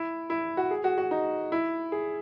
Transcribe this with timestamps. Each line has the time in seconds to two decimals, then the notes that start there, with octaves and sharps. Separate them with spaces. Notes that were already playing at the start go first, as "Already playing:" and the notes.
Already playing: E4
0.30 E4
0.57 F#4
0.71 G#4
0.84 F#4
0.98 F#4
1.11 D#4
1.52 E4
1.92 G#4